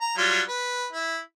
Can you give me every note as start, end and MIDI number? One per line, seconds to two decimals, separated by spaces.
0.01 0.15 82
0.17 0.41 54
0.17 0.41 55
0.17 0.41 65
0.48 0.86 71
0.92 1.19 64